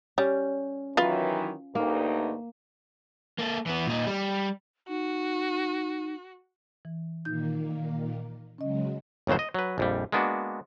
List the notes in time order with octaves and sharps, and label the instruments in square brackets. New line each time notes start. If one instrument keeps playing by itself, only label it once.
[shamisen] G3 [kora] C#4
[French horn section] D#3 E3 F#3 [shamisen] F4 B4
[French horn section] D2 G2 D#4 [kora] A#3
[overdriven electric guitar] A#3 A4
E3 B3
A#2 D#4
G3
[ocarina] D#4 [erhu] F#4
[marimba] E3
[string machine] A#2 D#3 A#3 [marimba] D#4 G6
[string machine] C#3 F#3 G#3 [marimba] C#4 D#5
[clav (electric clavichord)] G1 D#2 C#3 F#3 C5
D#5
F#3 B4
A#1 F2 G3
G#3 A#3 B3 D4 F#4